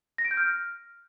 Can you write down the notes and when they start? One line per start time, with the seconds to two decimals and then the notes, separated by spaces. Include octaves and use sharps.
0.18 A#6
0.25 D7
0.31 G6
0.37 F6